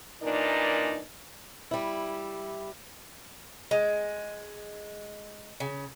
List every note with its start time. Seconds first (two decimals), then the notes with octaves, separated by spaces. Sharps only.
0.22 A#2 E3 D4 D#4 A#4 D5
1.71 G3 E4
3.71 G#3
5.60 C#3